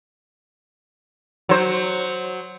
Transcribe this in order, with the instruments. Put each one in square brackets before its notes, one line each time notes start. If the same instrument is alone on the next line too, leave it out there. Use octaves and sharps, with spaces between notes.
[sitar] F#3 C5